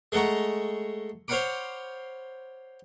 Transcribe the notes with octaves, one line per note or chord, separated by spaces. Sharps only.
G#3 A3 F#5 A#5 C#6
C5 C#5 F5 F#5 B5 D6